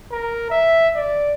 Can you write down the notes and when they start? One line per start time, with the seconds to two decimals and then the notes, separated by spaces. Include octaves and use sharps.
0.12 A#4
0.51 E5
0.95 D5